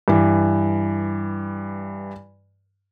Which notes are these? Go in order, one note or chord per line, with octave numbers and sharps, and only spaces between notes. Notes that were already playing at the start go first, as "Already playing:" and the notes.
G2 E3